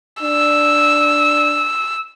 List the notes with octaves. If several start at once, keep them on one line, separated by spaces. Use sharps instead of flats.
D4 E6